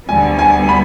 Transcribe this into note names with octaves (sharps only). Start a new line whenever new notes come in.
D2 D3 G3 B3 G#5
G#5
B5